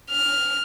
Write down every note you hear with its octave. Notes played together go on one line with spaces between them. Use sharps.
F6